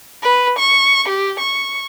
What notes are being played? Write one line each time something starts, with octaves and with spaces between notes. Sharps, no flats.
B4
C#6
G4
C#6